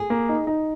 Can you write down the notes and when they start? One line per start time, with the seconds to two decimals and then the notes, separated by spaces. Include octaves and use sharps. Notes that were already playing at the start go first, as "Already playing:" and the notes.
Already playing: G#4
0.10 A#3
0.29 D#4
0.47 D#4